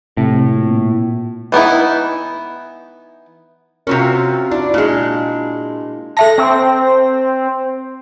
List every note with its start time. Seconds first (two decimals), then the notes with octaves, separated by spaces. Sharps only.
0.17 A2 C3
0.54 A#2
1.52 E3 B3 D#4 E4
3.87 C3 C4 C#4 F4 F#4 A#4
4.51 D4 E4
4.74 A#2 G#3 D4
6.17 A4 E5 A5 A#6
6.38 C4